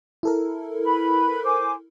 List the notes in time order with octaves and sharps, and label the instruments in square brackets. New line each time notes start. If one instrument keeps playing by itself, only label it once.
[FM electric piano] E4 A4 A#4
[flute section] B4 B5
C5 G#5 D6